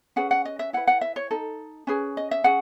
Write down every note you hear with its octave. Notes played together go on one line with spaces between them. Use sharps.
C#4 G#4 B4 F#5
F#5
D#5
E5
E4 B4 F#5
F#5
E5
C#5
D#4 A4
C#4 G#4 B4
D#5
E5
C#4 G#4 F#5